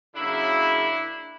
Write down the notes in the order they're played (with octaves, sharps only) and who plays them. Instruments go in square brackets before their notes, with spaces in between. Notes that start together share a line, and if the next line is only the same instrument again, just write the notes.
[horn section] C#3 F#3 A#3 D4 E4